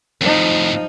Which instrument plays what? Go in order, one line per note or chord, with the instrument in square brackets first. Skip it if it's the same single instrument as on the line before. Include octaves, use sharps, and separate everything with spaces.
[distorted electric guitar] F2 A2 [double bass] F3 D#4